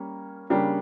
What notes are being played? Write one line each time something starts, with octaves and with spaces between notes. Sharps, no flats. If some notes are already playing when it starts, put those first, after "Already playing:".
Already playing: G3 A#3 C#4
C#3 G3 A#3 D4 G4